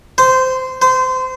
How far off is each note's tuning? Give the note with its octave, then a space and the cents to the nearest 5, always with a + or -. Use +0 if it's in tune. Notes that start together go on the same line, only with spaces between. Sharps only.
C5 -15
C5 -25